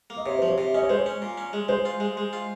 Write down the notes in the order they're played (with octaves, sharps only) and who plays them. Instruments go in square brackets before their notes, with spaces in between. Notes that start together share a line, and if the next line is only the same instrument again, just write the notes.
[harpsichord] A#3
[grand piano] D#5
[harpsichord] C3 [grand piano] C#5
[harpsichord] F3 [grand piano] C5
[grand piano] C#5
[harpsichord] C3
[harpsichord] C#4 [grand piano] D#5
[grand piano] C#5
[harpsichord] G#3 [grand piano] C5
[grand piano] C#5
[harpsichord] C#4
A#2
C#4
G#3
[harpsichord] G#3 [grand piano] C5
[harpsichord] F4
G#3
G#3
F4